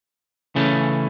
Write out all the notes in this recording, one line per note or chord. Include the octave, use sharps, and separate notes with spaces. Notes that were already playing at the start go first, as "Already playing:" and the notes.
C#3 E3 A3 C#4